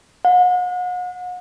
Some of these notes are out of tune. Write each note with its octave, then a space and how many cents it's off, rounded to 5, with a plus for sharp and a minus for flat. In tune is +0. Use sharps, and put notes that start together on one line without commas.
F#5 -40